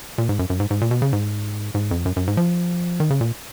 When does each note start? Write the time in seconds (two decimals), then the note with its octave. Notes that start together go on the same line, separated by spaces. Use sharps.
0.18 A#2
0.29 G#2
0.39 F#2
0.50 F#2
0.60 G#2
0.70 G#2
0.81 A#2
0.91 B2
1.02 C#3
1.13 G#2
1.74 G#2
1.91 F2
2.05 F#2
2.16 F#2
2.27 G#2
2.37 F3
3.00 D#3
3.10 C#3
3.21 A#2